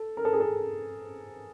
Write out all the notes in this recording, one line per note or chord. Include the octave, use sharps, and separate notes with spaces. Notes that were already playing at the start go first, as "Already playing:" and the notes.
Already playing: A4
A#4
A4
G#4
A4